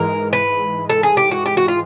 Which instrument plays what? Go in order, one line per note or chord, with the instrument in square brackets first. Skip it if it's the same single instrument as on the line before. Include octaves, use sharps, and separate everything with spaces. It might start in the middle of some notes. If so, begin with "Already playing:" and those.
Already playing: [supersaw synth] G#2 E3 G#3 [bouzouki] A#4
[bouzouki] B4
A4
G#4
G4
F#4
G4
F#4
F4